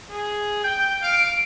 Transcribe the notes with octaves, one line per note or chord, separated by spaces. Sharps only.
G#4
G5 G6
F5 D7